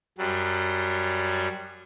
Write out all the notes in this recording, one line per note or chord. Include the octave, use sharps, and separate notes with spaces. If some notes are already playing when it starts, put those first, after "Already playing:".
F#2 F#3 G3